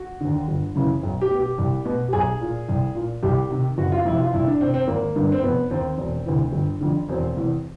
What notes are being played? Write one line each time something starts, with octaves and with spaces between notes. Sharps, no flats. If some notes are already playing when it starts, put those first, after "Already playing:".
Already playing: F#4
D#2 D3
G1
F#2 C#3 E3
B1
G4
B2
G4
C2
B2
G4
B1 G#4
A#2
C2
A#2
C2 G4
C3 D#3
F#1 F#4
F4
F2 C3 E4
F4
C2 E4
D4
C3 D#3 C4
C4
G#1 A#3
G2 D3
C4
F1 B3
D#2 D#3 C4
E1
D2 C3 E3
G1
F2 D3
E1 C4
E2 C3